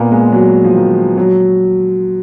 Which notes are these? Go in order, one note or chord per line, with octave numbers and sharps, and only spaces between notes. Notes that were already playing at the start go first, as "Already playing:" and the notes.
Already playing: A#2 A#3 B3
G#3
F#3
F3
D#3
F#3